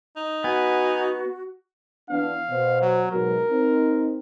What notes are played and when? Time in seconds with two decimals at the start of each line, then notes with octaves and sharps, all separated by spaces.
0.17 D#4
0.44 B3 F#4 G#5
2.10 E3 B3 D4 F5
2.50 B2 C5
2.81 F#3
3.12 G#2 B2 F#3 A#4
3.49 C4 D#4